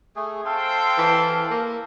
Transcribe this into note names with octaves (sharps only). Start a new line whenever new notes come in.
A3 G#4
C4 A4 C5 F5 G5 A5 C6
E3
A#3